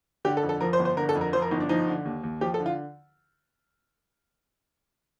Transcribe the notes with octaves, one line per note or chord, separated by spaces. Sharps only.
D3 G4
A4
F2
A4
F3 A#4
C5
G1
C5
D3 A#4
A4
F2
A#4
F3 C5
A#4
G1 D#4
D4
F3 D#4
D3
D#2
D#2
F3 G4
A4
D3
F4